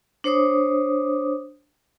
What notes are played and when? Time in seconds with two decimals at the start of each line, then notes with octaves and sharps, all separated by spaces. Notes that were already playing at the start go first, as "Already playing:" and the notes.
0.24 D4 C5 C#5 D6 D#6